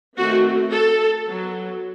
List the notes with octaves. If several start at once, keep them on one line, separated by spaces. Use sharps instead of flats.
D#3 A3 C4 F#4
A4
F#3 B3